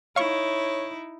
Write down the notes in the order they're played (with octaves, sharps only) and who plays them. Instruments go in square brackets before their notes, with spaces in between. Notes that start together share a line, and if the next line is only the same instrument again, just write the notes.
[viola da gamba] D#4 E4 [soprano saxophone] C#5 [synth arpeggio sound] F5 C#6